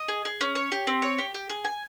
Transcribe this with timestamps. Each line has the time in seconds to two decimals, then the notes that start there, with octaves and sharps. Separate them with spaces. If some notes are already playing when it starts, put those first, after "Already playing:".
Already playing: D#5
0.08 G#4
0.25 G#4
0.41 C#4
0.55 C#5
0.72 G4
0.87 C4
1.02 C#5
1.18 G4
1.34 G4
1.50 G#4
1.65 G#5